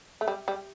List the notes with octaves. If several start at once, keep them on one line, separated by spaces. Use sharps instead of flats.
A3
G3
G3